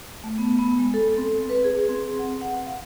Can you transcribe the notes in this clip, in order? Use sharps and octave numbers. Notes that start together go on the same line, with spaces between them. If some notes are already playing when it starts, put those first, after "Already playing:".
A3
B3
B3
G#3
A4
C4
B4
G#4
C4
F#5
F#5
F5